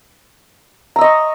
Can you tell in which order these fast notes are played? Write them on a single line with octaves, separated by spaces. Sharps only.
A#5 E6 D#5 C#6